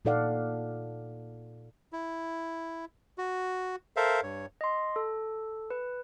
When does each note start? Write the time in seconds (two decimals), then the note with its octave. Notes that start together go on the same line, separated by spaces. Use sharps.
0.05 A#2 D#4 A4 D5 F5 F#5
1.93 E4
3.18 F#4
3.97 A4 A#4 C5 E5 F5
4.23 G2 C#5
4.61 D#5 C6
4.96 A4
5.70 B4